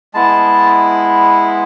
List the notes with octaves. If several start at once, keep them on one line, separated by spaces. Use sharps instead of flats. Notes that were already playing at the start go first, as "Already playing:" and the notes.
G#3 B3 E4 A5